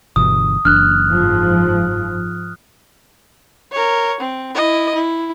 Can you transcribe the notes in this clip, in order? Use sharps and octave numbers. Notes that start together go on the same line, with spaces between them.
G1 B2 E3 D#6
F#1 E3 D4 F6 F#6
G#2 F3
A#4 C#5
C4
E4 D#5
E4